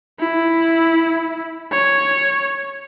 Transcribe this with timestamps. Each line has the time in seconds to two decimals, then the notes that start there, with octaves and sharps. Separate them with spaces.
0.19 E4
1.71 C#5